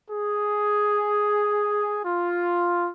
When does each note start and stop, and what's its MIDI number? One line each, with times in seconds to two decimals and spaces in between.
0.10 1.99 68
2.04 2.90 65